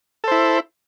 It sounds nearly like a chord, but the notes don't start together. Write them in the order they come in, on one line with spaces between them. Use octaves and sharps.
A4 C5 E4